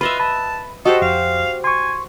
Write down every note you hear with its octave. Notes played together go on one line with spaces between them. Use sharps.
F4 B4 D#5 E5 B5
A5 B5
F#4 G4 A4 C5 D#5
F2 F5
G#5 C6 C#6